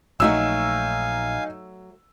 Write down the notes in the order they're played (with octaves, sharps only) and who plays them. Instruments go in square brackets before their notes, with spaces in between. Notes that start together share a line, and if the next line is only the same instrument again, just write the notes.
[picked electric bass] A#1 [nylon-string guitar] F#3 A3 F#4 [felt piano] D#4 E6 [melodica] F5 G#5